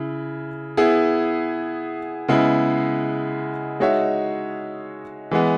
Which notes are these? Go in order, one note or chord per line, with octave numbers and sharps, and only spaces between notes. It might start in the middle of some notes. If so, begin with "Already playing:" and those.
Already playing: C#3 E4
B3 E4 G#4
C#3 G#3 B3 E4
G#3 D#4 F#4 C#5 E5
E3 G#3 B3